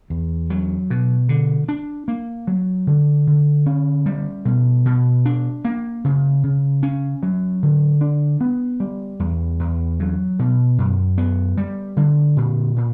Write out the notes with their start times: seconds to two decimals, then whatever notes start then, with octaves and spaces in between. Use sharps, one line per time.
0.10 E2
0.50 F#3
0.90 B2
1.29 D3
1.69 D4
2.08 A#3
2.47 F#3
2.87 D3
3.27 D3
3.66 C#4
4.06 G3
4.45 B2
4.86 B2
5.25 D4
5.65 A#3
6.05 C#3
6.43 C#3
6.83 C#4
7.23 F#3
7.63 D3
8.01 D4
8.41 B3
8.80 G3
9.20 E2
9.60 E2
10.00 F#3
10.39 B2
10.78 F#2
11.18 B3
11.57 G3
11.97 D3
12.37 A#2
12.76 A#2